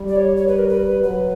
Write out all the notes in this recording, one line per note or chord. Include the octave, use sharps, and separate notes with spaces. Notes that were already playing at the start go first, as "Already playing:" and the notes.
Already playing: G3
D5
C#5
C#5
B4
A#4
B4
F#3 B4